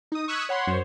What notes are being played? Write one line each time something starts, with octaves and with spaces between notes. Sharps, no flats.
D#4 D#6
C#6 D#6 E6 F#6 G#6 B6
C#5 F#5 B5 C6
F#2 C5 C#5